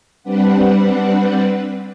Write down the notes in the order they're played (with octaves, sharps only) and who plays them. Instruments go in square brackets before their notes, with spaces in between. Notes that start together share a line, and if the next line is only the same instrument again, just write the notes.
[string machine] G3 C4 D4 B4 F#5